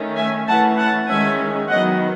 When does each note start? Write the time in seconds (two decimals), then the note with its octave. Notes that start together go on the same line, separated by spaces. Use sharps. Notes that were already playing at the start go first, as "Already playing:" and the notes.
Already playing: D#3 A3 C#4
0.16 E5 G#5
0.47 E3 A3 C#4 F#5 A5
0.77 F#5 A5
1.08 D#3 G#3 C#4 E5 G#5
1.69 D#3 F#3 B3 D#5 F#5